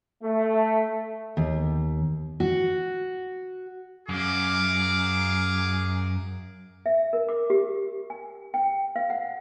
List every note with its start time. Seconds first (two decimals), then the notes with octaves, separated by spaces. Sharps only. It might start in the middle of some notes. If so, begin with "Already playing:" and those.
0.23 A3
1.37 D#2
2.40 F#4
4.09 F#2 G#4 F5 D6
6.86 E5
7.13 A#4
7.29 D6
7.50 G4
8.10 G#5
8.54 G5
8.96 F5
9.10 F#5